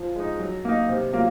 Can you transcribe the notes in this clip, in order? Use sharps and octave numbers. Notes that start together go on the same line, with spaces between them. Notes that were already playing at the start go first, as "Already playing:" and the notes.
Already playing: F3
G#3 D#4
F#3
A#3 D#4
C3
F#3 A#3 F4